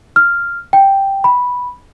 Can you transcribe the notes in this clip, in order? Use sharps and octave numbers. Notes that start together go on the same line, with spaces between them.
F6
G5
B5